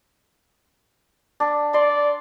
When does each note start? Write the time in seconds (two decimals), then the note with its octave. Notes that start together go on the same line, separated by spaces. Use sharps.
1.40 D4
1.74 D5 C6